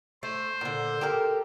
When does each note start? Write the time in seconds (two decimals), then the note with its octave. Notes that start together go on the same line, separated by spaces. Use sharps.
0.23 A3 C5
0.61 A#2 D3
1.01 G4 A4 A#4